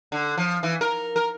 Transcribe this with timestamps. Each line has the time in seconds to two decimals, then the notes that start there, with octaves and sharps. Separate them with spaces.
0.12 D3
0.38 F3
0.63 E3
0.81 A#4
1.16 A#4